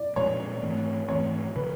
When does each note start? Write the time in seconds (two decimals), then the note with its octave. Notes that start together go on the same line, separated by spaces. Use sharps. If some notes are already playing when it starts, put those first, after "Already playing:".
Already playing: D5
0.16 A#2 F3 G#3 C#4 C#5
0.62 G#2 E3 A3 C4
1.08 G#2 E3 A3 C4 C#5
1.56 C#3 F3 B4